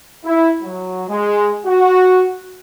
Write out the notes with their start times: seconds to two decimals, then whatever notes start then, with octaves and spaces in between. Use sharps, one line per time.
0.25 E4
0.62 F#3
1.09 G#3
1.66 F#4